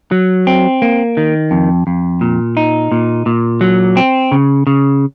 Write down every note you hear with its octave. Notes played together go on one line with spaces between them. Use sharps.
F#3
C4
A#3
D#3
F2
F2
A#2
D#4
A#2
A#2
F#3
C4
C#3
C#3